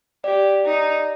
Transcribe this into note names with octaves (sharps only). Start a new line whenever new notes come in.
G4 D5
D#4